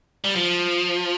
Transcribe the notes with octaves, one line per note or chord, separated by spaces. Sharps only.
G3
F3